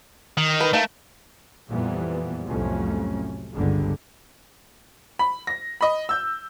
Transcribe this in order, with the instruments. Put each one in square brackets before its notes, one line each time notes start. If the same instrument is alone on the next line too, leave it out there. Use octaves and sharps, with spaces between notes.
[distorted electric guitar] D#3
[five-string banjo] B4
[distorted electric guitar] A3 [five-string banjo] D#4 A#4 F5
[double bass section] F2 A#2 E3 F3 G3 B3
C2 F2 A2 F#3 A3 C#4
G1 C#2 D3 G3 G#3
[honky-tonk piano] B5
A#6
D#5 B5
E6 G6